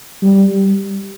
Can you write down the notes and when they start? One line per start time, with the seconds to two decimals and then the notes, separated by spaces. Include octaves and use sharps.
0.22 G3